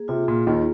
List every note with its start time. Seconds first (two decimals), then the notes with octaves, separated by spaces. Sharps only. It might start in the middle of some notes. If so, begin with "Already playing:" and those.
Already playing: A#3 G#4
0.08 C3 F4
0.28 A#2
0.47 D#2 D#3 A#3